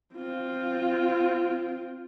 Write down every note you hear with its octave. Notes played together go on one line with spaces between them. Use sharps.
C4 F4